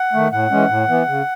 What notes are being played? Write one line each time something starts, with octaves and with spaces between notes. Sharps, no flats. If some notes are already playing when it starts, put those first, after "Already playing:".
Already playing: F#5
D#3 A3
A2 F#5
E3 G#3 C#4
A2
E3 B3
C#3